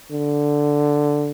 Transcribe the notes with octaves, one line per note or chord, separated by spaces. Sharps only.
D3